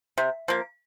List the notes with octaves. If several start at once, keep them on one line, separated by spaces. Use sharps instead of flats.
C3
F3 A#3